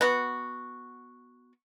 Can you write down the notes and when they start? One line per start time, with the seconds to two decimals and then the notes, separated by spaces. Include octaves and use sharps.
0.01 B3 F#4